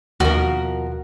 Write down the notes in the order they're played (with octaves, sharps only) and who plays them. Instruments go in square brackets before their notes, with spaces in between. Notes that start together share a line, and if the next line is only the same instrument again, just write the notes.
[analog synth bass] D#2 [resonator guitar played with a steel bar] B2 F3 A#4 [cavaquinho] F#4